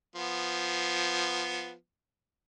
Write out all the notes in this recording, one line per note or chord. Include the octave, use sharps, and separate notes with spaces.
F3 B3